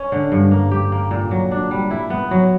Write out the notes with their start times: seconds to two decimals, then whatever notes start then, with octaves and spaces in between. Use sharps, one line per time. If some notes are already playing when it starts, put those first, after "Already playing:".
Already playing: C#4
0.12 D3
0.32 G2
0.51 A#3
0.71 G4
0.92 A#3
1.11 A#2
1.31 F#3
1.51 D4
1.71 G3
1.91 E4
2.10 B3
2.31 F#3